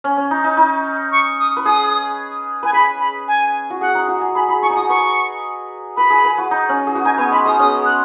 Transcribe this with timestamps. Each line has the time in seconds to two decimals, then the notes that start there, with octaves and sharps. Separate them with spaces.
0.04 C#4
0.17 C#4
0.31 D#4
0.44 D#4
0.57 D#4
1.12 C#6
1.39 D#6
1.57 B4
1.65 G#4 D#6
2.63 B4 G#5
2.73 G#4 B5
3.00 B5
3.28 G#5
3.70 F#4
3.81 G#4 F#5
3.95 D#4
4.08 F#4
4.21 G#4
4.35 G#4 B5
4.49 G#4 B5
4.62 G#4 C#6
4.70 D#4
4.75 F#4 D#6
4.89 B4 C#6
5.97 B4 B5
6.10 G#4
6.24 B4
6.38 F#4
6.51 D#4
6.69 C#4
6.87 G#4
6.95 F#4
7.05 D#4 G#5
7.18 B3 G#5
7.32 G#3 B5
7.46 G#3 D#6
7.59 C#4 D#6
7.86 F#6